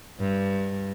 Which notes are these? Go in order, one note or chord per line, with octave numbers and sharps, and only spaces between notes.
G2